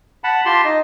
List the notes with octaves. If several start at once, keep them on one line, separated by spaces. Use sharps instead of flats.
F#5 A5 B5
F4 G4 A5 C6
D#4 D#5